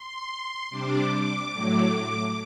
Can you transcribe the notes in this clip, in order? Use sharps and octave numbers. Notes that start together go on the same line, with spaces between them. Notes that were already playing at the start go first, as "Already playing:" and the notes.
Already playing: C6
C3 G3 D4 D6
D6
A2 F#3 A3